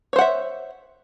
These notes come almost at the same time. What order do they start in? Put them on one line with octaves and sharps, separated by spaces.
C#5 C5 F#5 E5